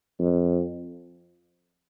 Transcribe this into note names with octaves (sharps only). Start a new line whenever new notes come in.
F2